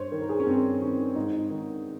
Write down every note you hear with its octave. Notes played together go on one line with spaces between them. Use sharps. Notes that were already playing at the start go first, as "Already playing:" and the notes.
Already playing: G2 C5 C#5
D#3 A#4
A#4
G#4
C#4
G2 C4
D#3 C#4
G#2 D#4
D#3